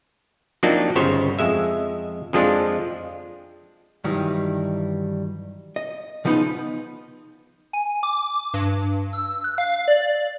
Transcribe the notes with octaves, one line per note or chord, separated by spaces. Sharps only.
F3 F#3 A#3 C4 D4 D#4
G1 C#3 B3 C5 C#5
F2 G#3 E5
F2 F3 G#3 D4 F4
G2 D#3 E3 F#3 G3
D#5
C#3 F3 B3 D#4 B5
G#5
D6
G2
E6
F#6
F5
D5